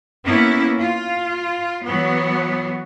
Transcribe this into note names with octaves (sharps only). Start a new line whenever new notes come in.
A#3 B3 C#4 E4
F4
E3 F#3 B3